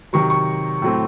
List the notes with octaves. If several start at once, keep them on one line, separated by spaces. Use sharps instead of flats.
C3 D#3 F#3 C#6
C#6
A2 F#3 A3 C4